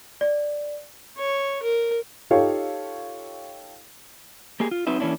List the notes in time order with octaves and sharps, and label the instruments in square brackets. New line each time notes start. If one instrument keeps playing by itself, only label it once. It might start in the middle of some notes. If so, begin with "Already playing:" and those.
[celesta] D5
[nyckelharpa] C#5
A#4
[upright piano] D#4 F4 G4 A4 C#5 F5
[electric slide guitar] A#3 G4 G#4
F4
F#3 C4 D#4 B4 E5
E3 A#3 C#4 D4 E4